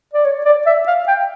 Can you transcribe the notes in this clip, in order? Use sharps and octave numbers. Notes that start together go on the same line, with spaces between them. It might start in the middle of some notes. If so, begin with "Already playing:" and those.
D5
C#5
D5
E5
F5
G5